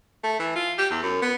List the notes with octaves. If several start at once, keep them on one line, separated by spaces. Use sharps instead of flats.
A3
E3
F4
G4
E2
F#2
B3